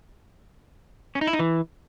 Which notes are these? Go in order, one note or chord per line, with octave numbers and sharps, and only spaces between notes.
C#4
D#4
E4
D#4
E3